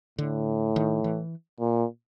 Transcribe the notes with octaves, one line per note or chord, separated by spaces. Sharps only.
A2 D3
D#3
E3
A#2